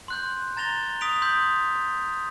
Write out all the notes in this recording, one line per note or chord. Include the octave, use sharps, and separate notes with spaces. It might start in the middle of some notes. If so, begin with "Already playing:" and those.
C6 F#6 G6
A#5 A6 A#6 F7 G7
D#6 B6 D7 F7
C6 D#6 E6 G6